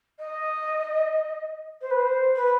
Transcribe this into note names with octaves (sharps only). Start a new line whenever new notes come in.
D#5
C5
B4
C5
B4